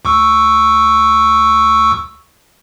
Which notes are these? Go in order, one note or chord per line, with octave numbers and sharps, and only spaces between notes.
D2 C#6 E6